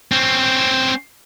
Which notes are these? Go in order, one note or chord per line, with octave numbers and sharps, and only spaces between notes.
C4 C#4